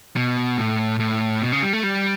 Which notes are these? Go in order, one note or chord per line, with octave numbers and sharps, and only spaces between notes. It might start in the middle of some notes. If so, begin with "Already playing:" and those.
B2
A2
A2
B2
C#3
G3
A3
G3